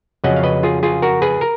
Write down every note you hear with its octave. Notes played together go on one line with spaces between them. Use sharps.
F2 C#3 F#3 C#4 D#5 F#5
F5
B4 D#5
F4 G#4
F4 G#4
F#4 A#4
G#4 B4
A#4